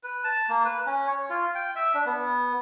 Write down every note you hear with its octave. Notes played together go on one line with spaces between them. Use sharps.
B4
A5
A#3
B4
C#4
C#5
F4
G5
E5
D4
B3